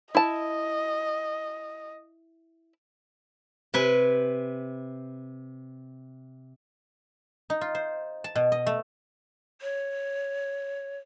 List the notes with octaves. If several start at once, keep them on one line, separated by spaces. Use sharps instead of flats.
E4 D#5 A5
C3 B4 G#5
D#4
F4
C5
A5
B2
D#5
A3
C#5